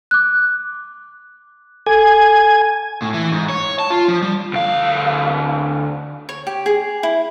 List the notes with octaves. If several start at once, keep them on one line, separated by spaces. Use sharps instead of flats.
D6 F#6
A4 G#5
A2
E3
G#2
C#5
A5
F4
F3
G3
D2 F5
C#5
G4
G#4
E4